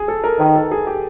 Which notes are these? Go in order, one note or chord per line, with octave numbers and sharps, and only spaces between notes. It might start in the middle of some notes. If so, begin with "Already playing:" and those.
Already playing: G#4
A4
A#4
D#3 B4
A4
G#4
G4